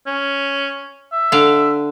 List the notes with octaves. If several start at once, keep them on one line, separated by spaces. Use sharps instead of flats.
C#4
E5
D3 F5